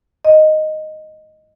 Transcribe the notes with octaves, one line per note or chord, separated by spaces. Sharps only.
D#5